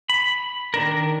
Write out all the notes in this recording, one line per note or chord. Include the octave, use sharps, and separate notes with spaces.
B5
D#3 D4 A#4